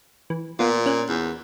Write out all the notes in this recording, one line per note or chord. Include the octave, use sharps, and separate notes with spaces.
E3
A#2 B3 F4
C#4 F#6
E2